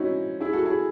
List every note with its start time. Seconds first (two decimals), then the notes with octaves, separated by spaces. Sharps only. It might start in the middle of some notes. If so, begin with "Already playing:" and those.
Already playing: C4 C#4 D#4 E4 F#4
0.40 E4 G#4
0.53 F#4 A4
0.65 E4 G#4